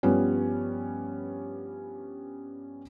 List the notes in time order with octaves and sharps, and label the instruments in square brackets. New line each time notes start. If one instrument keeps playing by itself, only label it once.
[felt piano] G2 F3 G3 B3 C#4